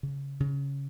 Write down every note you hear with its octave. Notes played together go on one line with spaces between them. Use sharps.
C#3
C#3